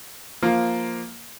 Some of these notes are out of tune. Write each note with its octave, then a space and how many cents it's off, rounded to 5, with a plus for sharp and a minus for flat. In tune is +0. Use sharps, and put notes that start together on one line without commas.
F3 +0 A#3 +0 F4 +0